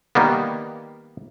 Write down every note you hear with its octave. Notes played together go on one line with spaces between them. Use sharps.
D#3 G3 A#3 B3